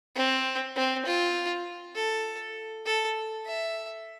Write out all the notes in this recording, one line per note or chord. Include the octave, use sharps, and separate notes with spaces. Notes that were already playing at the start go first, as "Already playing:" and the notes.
C4
C4
F4
A4
A4
E5